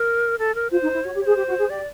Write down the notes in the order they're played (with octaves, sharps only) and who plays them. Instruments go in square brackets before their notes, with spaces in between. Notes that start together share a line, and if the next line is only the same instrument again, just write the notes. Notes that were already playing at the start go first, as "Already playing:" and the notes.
Already playing: [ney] A#4
A4
A#4
[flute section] F4 [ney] C5
[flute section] D#4
E4
[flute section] F#4 [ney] C#5
[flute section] G4
[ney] C#5
[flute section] G#4 [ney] C5
[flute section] G4
F#4
G#4
[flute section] G4 [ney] D5